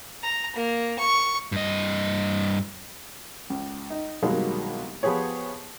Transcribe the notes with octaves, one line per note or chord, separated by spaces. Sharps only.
A#5
A#3
C#6
G2 D#5
C#2
D#4
C2 B2 D#3 F#3 G#3 A#3
F3 B3 G4 G#4 C#5